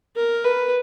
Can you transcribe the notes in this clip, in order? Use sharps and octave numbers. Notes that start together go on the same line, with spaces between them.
A#4
B4